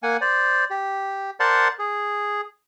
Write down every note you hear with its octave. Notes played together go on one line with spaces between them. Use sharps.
A#3 F#5 G#5
C5 D5
G4
A#4 C5 D5 F#5 A5 C6
G#4